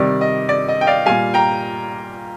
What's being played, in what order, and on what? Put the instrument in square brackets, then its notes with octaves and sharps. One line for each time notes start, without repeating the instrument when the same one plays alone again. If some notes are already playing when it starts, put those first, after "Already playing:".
Already playing: [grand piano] C3 D#3 G3 D5
D#5
D5
D#5
G5
D5 F5
A#2 G3 F5 G#5
G5 A#5